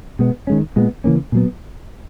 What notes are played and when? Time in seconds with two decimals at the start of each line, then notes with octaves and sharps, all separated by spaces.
0.19 B2 G#3 B3
0.47 D#3 G#3 C#4
0.76 A#2 G#3 B3
1.04 C#3 E3 A#3 C#4
1.32 A#2 F#3 B3